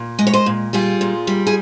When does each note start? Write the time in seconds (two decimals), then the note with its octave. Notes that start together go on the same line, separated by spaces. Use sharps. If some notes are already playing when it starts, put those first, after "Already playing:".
Already playing: A#2
0.19 G#3 D#5
0.27 C#5
0.33 C5 D#5
0.46 A#2
0.73 G3 F4 G#4
1.01 A#2
1.27 G3
1.47 G#4